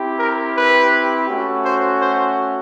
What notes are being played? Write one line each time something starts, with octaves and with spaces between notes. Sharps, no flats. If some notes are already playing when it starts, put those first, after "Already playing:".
Already playing: C4 E4 G4
A#4
B4
A3 C#4 F#4
C5
C5